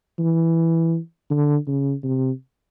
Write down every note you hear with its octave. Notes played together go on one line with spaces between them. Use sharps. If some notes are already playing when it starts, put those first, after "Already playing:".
E3
D3
C#3
C3